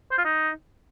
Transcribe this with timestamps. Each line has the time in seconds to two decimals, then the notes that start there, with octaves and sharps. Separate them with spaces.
0.11 C5
0.18 F4
0.25 D#4